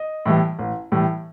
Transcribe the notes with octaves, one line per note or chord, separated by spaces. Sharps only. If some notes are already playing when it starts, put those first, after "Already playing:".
Already playing: D#5
A2 E3 G3
A1
A2 E3 G3